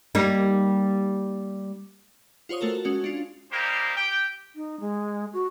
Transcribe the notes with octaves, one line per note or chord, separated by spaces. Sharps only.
G3 A#3 D#4
F4 F#4 C5 C#5 D#6
A3 F#4 A4 A#4
G#3 C#4 F#4 C#7
D4 F4
G3 A#3 D#4 G4 A#4 C5
G4 G5
D#4
G#3
F#4